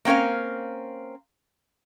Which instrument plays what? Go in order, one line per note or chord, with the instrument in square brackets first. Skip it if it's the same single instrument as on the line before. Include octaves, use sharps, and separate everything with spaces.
[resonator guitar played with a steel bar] A#3 C4 C#4 A#4 F5